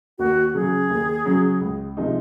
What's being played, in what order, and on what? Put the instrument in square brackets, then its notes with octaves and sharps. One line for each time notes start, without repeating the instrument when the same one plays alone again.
[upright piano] D#2 [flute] F#4
[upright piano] C#3 F#3 C#4 [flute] G#4
[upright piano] D#2
C#3 F#3 C#4
C#2
C3 F3 G#3 D#4